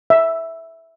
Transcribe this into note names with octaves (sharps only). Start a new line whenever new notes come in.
E5